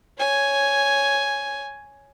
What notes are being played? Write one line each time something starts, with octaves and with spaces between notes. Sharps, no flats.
C#5 G#5